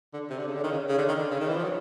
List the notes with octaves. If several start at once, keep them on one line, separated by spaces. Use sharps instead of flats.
D3
C3
D3
C#3
D3
D#3
C#3
C#3
D3
D#3
D3
C#3
D#3
E3
F3
F#3